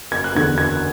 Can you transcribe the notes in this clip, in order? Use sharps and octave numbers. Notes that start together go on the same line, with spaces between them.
F#1 G#6
F#6
E2 D3 G#6
F#1 G#6